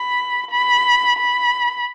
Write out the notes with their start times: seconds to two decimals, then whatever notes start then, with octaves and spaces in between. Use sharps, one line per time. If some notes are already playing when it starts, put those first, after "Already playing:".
Already playing: B5
0.52 B5
1.19 B5